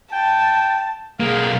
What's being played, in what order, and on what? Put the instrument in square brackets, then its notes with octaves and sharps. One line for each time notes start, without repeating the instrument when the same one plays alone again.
[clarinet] G5 [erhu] A5
[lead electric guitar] B1 A#3 [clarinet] G#4 [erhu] F5